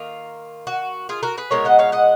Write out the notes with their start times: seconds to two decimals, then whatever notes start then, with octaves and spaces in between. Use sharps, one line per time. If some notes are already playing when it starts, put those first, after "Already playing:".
Already playing: D#3 A#3 F4
0.67 F#4
1.09 F4 G#4
1.23 F#4 A#4
1.37 G#4 B4
1.51 A#2 G#3 B3 A#4 C#5
1.65 D#5 F#5
1.79 C#5 F5
1.92 D#5 F#5